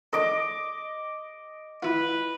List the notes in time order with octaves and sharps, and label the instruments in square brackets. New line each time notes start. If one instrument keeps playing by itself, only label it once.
[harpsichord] D4 A4 [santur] D#5 D6
[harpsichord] E4 F4 [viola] B4